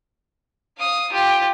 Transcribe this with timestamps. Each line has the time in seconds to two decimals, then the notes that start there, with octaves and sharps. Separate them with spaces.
0.78 F5 D#6
1.11 F4 G4